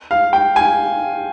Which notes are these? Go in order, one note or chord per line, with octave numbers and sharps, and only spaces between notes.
F5
G5
G#5